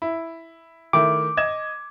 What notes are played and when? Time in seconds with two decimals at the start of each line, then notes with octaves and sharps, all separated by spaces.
0.02 E4
0.93 D#3 A3 E4 D6
1.37 D#5 G#6 E7